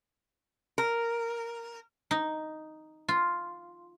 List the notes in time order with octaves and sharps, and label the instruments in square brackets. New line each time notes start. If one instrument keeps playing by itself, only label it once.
[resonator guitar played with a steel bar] A#4
[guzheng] D#4
F4